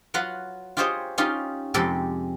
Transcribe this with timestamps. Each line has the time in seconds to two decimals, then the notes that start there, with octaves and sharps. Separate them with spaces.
0.14 F#3 F4 B4 F5 F#5
0.77 F4 G4 G#4 C5 C#5 D#5
1.18 C#4 D#4 F4 G4
1.74 F2 C3 G#3 G4 A4